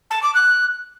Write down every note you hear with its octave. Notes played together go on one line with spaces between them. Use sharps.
A5
D6
F#6